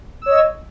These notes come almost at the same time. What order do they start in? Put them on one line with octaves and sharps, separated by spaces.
E6 C#5 D#5